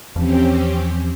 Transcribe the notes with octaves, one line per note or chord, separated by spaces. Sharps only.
E2 E3 F3 C4 C#4 G4